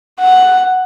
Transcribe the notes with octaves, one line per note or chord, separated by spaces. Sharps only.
F#5